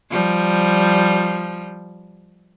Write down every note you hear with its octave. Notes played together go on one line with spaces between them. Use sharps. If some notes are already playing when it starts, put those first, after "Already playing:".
F3 G3